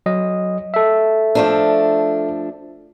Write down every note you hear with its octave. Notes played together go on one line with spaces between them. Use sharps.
F#3 D#5
A4 E5
F3 A3 D4